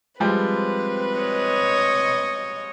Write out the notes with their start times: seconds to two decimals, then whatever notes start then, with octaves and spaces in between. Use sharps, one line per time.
0.20 F3 G3 G#3 C4 B4
1.18 C#5 D#5